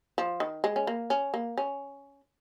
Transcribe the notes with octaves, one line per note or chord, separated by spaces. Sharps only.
F3
D#3
G#3
C#4
A#3
C#4
A#3
C#4